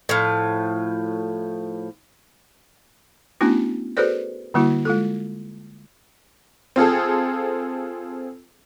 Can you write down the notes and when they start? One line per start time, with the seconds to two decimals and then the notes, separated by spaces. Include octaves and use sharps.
0.09 A2 F3
3.41 A3 B3 C#4 D4 E4 F#4
3.97 F#4 G#4 A4 B4 C5 D5
4.54 D3 G3 A#3 E4 F#4
4.85 G#3 F4 A4
6.76 C4 F4 G#4 A4